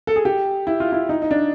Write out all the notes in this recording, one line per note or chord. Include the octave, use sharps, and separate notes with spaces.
A4
G#4
G4
E4
F4
E4
D#4
D#4
D4